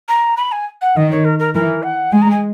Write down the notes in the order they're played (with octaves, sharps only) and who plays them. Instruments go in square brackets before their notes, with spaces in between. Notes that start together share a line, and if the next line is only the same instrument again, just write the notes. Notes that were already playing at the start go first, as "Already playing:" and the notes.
[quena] A#5
B5
G#5
F#5
[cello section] D#3 [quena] D#5
[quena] C#5
A#4
A#4
[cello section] E3 [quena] A#4
[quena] F#5
[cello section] G#3 [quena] G#5
[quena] A#5
G#5